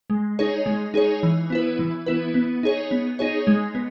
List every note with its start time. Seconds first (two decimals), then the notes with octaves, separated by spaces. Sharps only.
0.10 G#3
0.39 D#4 G#4 C#5
0.66 G#3
0.94 D#4 G#4 C#5
1.23 E3
1.50 B3 E4 B4
1.79 E3
2.06 B3 E4 B4
2.34 B3
2.63 D#4 G#4 C#5
2.91 B3
3.19 D#4 G#4 C#5
3.47 G#3
3.75 B3